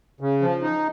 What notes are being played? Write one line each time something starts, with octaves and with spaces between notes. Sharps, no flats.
C#3
F3
D#4